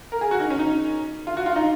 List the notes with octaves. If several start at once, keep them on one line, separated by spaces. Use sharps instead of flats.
A#4
G#4
F#4
D#4
C#4
D#4
F4
F#4
F4
D#4